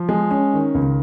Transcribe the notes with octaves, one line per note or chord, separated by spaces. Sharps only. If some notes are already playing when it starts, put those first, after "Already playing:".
Already playing: F3
G#3
C#4
D#3
C#2